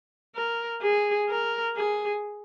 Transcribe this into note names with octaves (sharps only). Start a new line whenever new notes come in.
A#4
G#4
A#4
G#4